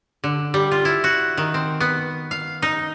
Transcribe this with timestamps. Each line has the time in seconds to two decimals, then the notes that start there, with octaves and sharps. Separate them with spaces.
0.24 D3
0.54 G3
0.71 F4
0.85 E4
1.04 F#4
1.37 D#3
1.54 C4
1.80 B3
2.31 F5
2.62 D#4